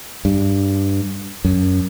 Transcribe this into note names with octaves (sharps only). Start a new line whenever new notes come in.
G2
F#2